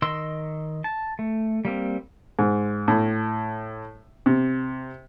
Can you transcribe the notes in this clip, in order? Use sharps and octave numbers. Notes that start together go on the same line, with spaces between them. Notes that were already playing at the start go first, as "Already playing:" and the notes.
D#3 D#5 C6 E6
A5
A3
G3 A#3 C4
G#2
A2
C3